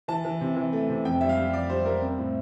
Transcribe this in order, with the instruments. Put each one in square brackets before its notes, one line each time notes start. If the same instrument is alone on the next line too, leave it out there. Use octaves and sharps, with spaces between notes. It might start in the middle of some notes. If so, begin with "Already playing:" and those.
[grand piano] E3 A5
E3
C3
E3
A3
C3
F2 G5
G3 E5
F5
G3
F2 D5
G3 C5
G3 A#4
C4
A2